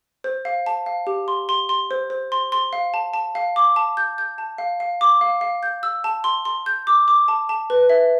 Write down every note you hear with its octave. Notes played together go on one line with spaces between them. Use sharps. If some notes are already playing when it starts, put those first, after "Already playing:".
C5
F5
A5
F5
G4
C6
C6
C6
C5
C5
C6
C6
F5
A5
A5
F5
D6
A5
G6
G6
A5
F5
F5
D6
F5
F5
G6
E6
A5
C6
C6
G6
D6
D6
A5
A5
B4
E5